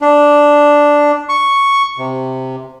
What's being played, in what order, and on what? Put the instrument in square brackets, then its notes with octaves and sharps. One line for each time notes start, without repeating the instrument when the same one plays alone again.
[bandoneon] D4
C#6
C3